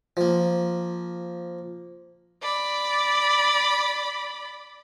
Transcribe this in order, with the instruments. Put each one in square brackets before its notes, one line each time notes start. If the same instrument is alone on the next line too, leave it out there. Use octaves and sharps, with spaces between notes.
[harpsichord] F3 A#3
[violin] D5 B5